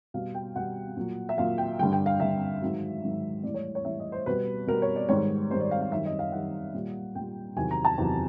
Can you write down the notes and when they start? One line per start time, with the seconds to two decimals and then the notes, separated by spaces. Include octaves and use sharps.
0.14 B2 G3 F5
0.34 G5
0.56 B2 G3 F#5
0.97 A#2 F#3
1.29 E5
1.37 A#2 F#3 F5
1.58 G5
1.79 G2 D3 G3 G5
1.92 G5
2.06 F5
2.20 G2 D3 G3 E5
2.62 G#2 D#3 F#3
3.03 G#2 D#3 F#3
3.43 A2 E3 G3 D5
3.54 C#5
3.75 C#5
3.85 A2 E3 G3 E5
3.99 D#5
4.12 C5
4.26 B2 G3 B4
4.67 B2 G3 A#4
4.82 C#5
4.96 D5
5.09 G#2 D#3 G3 C#5
5.50 G#2 D#3 G3 C5
5.60 D5
5.71 F5
5.82 F5
5.92 F#2 D#3 G3 E5
6.06 D#5
6.19 F5
6.32 F#2 D#3 G3 F#5
6.74 A#2 G3
7.15 A#2 G3 G5
7.56 E2 C3 D#3 F#3 G#5
7.71 A#5
7.85 A5
7.97 E2 C3 D#3 F#3